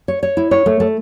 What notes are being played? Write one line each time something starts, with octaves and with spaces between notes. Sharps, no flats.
C#5
C#5
E4
C#5
A3
A3